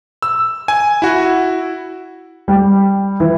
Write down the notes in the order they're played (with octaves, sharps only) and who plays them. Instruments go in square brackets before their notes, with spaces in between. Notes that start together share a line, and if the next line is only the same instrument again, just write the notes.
[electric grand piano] E6
G#5
E4 F#4
[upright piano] G3
E3